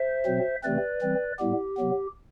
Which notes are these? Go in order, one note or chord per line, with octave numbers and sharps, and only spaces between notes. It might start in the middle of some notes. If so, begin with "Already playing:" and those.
Already playing: C5 E5
B2 F#3 C4
C3 E3 A3 C4 B4 D5
E3 G3 C4
A2 G3 B3 G4
C3 F#3 B3